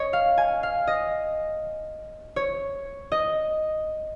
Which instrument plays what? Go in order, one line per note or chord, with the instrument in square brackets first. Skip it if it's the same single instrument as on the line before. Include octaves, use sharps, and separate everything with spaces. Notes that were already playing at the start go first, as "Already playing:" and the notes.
Already playing: [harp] C#5 D#5
F5
G#5
F5
D#5
C#5
D#5